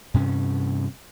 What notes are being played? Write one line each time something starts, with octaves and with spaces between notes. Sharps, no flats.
G2 C3 C#4